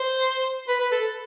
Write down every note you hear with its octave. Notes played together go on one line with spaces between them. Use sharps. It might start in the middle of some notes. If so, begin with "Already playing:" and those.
Already playing: C5
B4
B4
A4